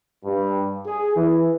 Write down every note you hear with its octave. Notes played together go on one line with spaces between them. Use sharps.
G2
G#4
E3